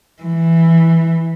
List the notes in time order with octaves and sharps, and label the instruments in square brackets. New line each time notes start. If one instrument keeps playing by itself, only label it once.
[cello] E3